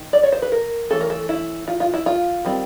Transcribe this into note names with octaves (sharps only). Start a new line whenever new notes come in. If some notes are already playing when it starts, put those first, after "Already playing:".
Already playing: D#3
D5
C#5
C5
B4
A#4
E3 A3 C#4 A4
A#4
A4
E4
F4
F4
E4
F4
D#3 G3 C4